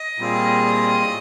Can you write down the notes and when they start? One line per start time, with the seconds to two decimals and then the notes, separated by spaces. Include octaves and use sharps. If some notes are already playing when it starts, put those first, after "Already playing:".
Already playing: D#5
0.18 A#2 G3 C4 F4 G#4
1.04 A2